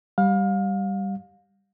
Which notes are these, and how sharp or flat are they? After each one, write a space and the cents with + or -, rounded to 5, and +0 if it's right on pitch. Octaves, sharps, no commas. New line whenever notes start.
G3 +0 F5 +30